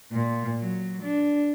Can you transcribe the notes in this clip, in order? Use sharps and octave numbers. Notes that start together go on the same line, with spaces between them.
A#2
F#3
D4